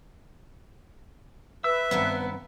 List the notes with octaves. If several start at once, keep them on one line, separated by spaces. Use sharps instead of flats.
B4 E5 E6
G2 D#3 B3 C4